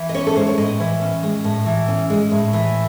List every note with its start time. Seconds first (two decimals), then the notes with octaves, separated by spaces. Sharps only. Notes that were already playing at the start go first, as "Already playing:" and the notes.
Already playing: E3
0.09 D#5
0.14 C#4 C#5
0.27 A4
0.36 G#3 C5
0.47 C#5
0.58 A2 D#5
0.80 E3
1.01 C#4
1.23 G#3
1.44 A2
1.66 E3
1.88 C#4
2.10 G#3
2.31 A2
2.53 E3